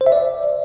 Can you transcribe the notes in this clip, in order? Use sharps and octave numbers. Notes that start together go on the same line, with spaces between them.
C5
E5
D5